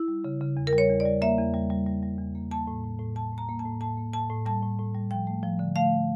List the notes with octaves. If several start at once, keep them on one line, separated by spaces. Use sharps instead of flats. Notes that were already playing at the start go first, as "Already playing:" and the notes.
Already playing: E4
G3
C#3
C#3
E2
A#4
G3
C#5
E2
D5
G3
A#3 E5
E2
G3
G3
G3
G3
E2
A#3
A#3 A5
A2
A2
A2
A2 A5
A2
A#5
A#3
A5
A2
A2 A5
A#3
A2 A5
A2
G3 A5
A2
A2
G3
F3 G5
A3
F3
D3
A3 F5